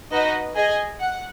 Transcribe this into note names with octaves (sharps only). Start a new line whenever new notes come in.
D#4 F#4 B4 D#5
G#4 D#5 G#5
F#5